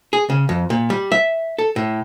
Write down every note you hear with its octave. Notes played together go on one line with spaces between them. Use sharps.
G#4
C#3
F2
A#2
G3
E5
A4
A2